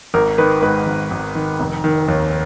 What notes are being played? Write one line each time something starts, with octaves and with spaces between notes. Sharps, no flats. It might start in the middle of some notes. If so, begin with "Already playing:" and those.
G#1 A#4
D#3 B4
G#2 B4
G#1
G#1
D#3
F1
D#3
D#2